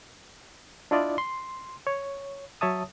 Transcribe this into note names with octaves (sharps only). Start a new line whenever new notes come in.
D4 E4 F4 D5 D#5
C6
C#5
F#3 C#5 E5 A5 D#6